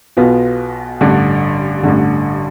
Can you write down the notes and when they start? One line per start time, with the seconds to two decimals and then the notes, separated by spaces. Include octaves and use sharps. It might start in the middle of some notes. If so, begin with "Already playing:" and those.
0.17 B1 B2 B3 F4
1.01 A1 G2 D3
1.83 A1 G2 D3